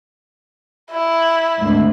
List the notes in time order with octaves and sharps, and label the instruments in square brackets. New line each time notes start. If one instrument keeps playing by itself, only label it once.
[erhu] E4
[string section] G#1 D2 G#2